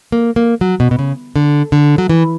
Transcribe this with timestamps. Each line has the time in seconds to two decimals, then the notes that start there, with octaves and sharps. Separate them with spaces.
0.12 A#3
0.36 A#3
0.61 F#3
0.80 B2
0.91 B2
0.99 C#3
1.36 D3
1.72 D3
1.98 F#3
2.10 E3